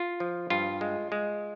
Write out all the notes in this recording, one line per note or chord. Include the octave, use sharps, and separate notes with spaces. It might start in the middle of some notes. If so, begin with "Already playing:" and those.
Already playing: F4
F3
G2 F4
G#3
G#3